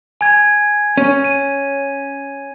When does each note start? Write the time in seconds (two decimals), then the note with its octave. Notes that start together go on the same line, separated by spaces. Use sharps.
0.21 G#5 G#6
0.98 C#4
1.24 D#7